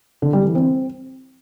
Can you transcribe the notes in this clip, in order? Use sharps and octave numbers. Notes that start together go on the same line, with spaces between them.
D3
G3
E3
C4